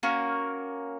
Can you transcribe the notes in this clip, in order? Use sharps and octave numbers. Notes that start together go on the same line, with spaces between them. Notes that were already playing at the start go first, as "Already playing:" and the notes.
A#3 C#4 F#4 A#4